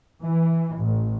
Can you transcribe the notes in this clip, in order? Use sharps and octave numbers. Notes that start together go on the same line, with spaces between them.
E3
A1